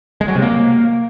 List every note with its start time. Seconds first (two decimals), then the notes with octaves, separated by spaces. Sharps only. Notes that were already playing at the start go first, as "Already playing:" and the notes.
0.21 G#3
0.28 F#3
0.35 C3
0.42 A#3